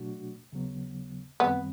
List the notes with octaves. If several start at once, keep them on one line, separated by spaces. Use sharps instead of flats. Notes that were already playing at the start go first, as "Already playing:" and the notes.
Already playing: B2 F#3 A3 D4 F#4
D#2 C#3 F#3 B3
F#2 D#3 G3 B3 C4